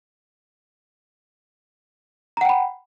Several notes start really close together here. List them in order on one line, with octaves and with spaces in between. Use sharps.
A#5 F#5 G5 B5